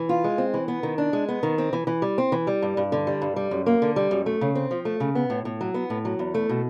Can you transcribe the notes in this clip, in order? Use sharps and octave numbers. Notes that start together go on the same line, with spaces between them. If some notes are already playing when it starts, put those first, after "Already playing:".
Already playing: E3
F4
G#3
C4
E3
B3
D#3
D4
G#3
B3
D#3
C4
E3
E3
G3
C4
E3
G3
G2
G2
D3
G3
G2
G3
F#2
A#3
D3
G3
F#2
A3
C#3
C4
F3
A3
C#3
B3
A2
A2
F#3
B3
A2
F#3
E2
A3
B2